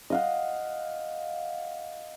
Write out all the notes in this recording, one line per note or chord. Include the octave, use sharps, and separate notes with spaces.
D#5 F5 F#5